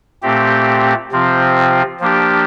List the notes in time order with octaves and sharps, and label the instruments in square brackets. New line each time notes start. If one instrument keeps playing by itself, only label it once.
[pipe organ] A#2 A3 C4 G4
C3 F3 C4 F4
F3 A#3 D4 G4